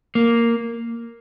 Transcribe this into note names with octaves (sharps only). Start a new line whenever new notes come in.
A#3